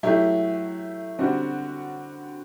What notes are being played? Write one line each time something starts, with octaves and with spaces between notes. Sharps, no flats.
F#3 A3 E4 G4
D3 G3 C4 F#4